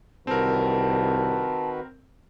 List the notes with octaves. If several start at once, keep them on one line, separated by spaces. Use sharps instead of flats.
C2 D#3 C4 F#4 A#4 B4 A5